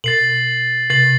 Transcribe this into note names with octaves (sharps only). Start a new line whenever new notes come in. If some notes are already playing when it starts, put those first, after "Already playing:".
B2 A6 C7 F#7
C3 A6 C7 F#7